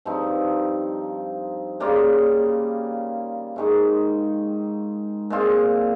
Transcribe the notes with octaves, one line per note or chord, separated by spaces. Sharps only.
G2 F3 C4 D#4
C#3 G3 A#3 F4
G#2 D#3 G#3 D#4
A#2 G#3 C4 F4